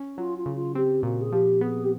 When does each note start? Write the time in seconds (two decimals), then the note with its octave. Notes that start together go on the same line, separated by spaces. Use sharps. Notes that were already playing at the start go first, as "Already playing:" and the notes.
Already playing: C#4
0.17 F#3 F4
0.37 F4
0.46 C#3
0.55 F4
0.75 C4 G4
1.03 A#2 F#4
1.21 G#4
1.32 F3 G4
1.61 B3 G#4
1.83 G4